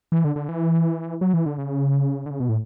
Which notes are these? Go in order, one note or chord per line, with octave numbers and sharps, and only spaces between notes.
E3
D3
D3
E3
F#3
E3
D3
C#3
D3
C#3
B2
A2